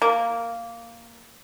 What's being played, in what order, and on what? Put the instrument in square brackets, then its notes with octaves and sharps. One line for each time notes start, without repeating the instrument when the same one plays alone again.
[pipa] A#3